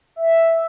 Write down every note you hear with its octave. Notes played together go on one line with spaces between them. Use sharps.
E5